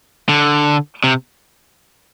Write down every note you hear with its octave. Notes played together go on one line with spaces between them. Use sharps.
D3
C3